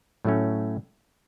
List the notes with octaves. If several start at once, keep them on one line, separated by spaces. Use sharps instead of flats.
A2 F#3 A3 C#4